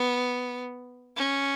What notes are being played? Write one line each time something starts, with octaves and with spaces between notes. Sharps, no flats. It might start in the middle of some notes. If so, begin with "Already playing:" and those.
Already playing: B3
C#4